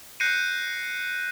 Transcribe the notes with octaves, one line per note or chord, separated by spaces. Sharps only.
F#6 G6 A#6 C7 C#7 D#7